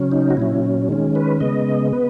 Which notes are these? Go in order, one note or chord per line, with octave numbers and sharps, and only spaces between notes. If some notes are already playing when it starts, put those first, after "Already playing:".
Already playing: C#3 F#3 C#4
D#4
F#4
A#2 F#3 C#4 E4
D#3 G#3 C#4
B4
C#3 G#3 B3 D#5
B3 B4